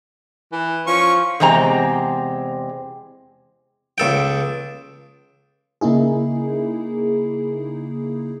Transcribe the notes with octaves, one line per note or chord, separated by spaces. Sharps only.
E3
F3 C#4 C#6
E2 C3 G#3 C4 A#5
C#2 A4 G5
C#3 A#3 D#4 E4 G#4